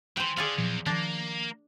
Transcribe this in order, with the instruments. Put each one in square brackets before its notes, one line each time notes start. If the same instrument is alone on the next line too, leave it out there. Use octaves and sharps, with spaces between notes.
[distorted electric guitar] E3 [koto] C5 G5
[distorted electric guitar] D3 [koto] G#4 D5 F5
[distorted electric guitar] E2 [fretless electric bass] A#2 F3 F#3
[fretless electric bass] D#3 F3 [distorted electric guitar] A#3 [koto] D4